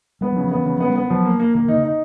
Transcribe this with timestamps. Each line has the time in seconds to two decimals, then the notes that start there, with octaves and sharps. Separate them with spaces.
0.21 G3 B3
0.32 C#3 F#3
0.44 F3
0.52 E3 B3
0.66 C#3 E3
0.76 F3 B3
0.88 G3
0.95 B3
1.10 F3 F#3
1.25 A#3
1.39 A#3
1.54 D#3 A#3
1.65 D#3
1.68 C3 D#4
1.76 C#3
1.84 D#4